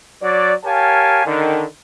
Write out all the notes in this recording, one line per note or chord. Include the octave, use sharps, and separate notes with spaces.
F#3 D5
G4 A#4 C#5 F5 G#5 A5
D3 D#3